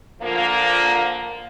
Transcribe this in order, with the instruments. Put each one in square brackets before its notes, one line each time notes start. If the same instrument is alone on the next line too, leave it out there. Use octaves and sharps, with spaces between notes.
[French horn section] A#2 D3 F3 A#3